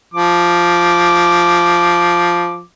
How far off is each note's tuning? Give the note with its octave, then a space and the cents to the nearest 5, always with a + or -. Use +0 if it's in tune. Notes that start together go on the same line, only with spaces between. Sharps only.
F3 +0 D6 +0